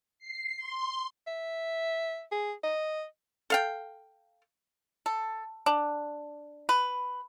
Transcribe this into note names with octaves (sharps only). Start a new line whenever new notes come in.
C7
C6
E5
G#4
D#5
A4 F5 G5
A4
D4
B4